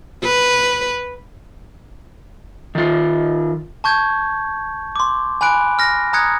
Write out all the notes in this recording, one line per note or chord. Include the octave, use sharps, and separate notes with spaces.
B4
D#3 F4
A5 C#6 G6 G#6
C6 D6
G#5 B5 F#6 D7
F6 A#6
A#5 D#6 F#6 G#6 C#7